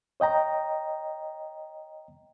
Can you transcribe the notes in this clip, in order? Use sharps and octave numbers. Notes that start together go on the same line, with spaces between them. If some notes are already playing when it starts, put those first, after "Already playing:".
C#5 D#5 G5 A#5